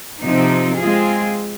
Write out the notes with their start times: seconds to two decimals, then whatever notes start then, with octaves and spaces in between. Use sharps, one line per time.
0.24 C3 F3 C4 D#4
0.79 G#3 C4 F4 G#4